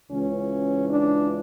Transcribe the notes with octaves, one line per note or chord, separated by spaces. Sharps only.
C#2 C#3 E3 C#4
D4